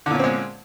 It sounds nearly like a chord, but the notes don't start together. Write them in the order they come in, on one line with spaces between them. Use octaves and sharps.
D3 A#2 C#4 C4 G#3